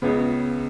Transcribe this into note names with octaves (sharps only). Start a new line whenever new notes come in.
C#2 C#3 B3